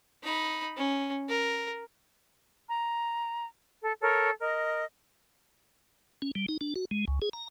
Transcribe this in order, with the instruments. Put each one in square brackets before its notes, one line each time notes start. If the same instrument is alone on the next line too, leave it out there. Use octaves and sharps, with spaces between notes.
[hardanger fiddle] D#4 B5
C#4
A#4
[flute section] A#5
A4
A4 A#4 C#5
A#4 D#5
[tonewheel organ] C#4
G3
D#4
D4
F#4
G#3
C#2
G#4
A#5